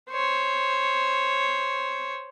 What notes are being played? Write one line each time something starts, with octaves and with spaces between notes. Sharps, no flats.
C5 C#5